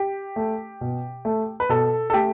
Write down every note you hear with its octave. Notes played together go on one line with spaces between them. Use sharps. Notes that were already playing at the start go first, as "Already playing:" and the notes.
Already playing: G4
A3
B2
A3
B4
B2 A4
A4
A3 G4